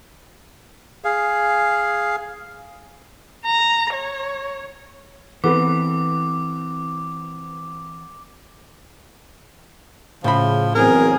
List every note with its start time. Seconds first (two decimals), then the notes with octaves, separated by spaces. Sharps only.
1.04 G#4 F5
3.45 A#5
3.93 C#5
5.44 E3 B3 C4 A4 B4 D6
10.24 A2 C#3 F3 B5
10.75 E2 F#3 C4 G#4 A#4